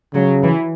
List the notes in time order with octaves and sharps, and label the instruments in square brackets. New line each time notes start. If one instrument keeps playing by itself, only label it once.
[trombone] C#3 [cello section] F#3
[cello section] E3